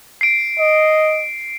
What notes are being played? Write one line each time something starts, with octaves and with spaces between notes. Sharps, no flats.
C7 D7
D#5